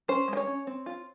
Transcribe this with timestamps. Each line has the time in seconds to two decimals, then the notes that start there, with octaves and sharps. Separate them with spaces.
0.08 C#4 C5
0.28 G#3
0.33 C5
0.37 C#5
0.47 C#4
0.67 C4
0.86 F4